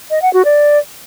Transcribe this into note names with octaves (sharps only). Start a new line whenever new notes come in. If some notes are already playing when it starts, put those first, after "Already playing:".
D#5
F#5
F#4
D5